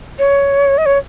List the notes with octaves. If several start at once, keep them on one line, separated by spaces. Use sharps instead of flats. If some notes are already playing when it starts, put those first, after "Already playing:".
C#5
D#5
C#5